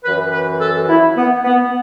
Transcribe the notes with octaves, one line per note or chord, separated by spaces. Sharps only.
F#2 E3 B4
B4
A4
E4
B3
B3